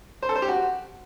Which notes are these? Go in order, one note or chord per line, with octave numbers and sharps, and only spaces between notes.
C5
A4
C5
G4
F#4